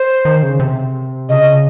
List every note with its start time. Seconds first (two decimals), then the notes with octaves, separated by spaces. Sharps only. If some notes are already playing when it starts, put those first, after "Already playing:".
Already playing: C5
0.25 D#3
0.43 C#3
0.60 C3
1.29 C#3 D#5